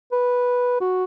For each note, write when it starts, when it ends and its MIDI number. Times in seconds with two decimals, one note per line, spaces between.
0.12 0.80 71
0.81 1.04 66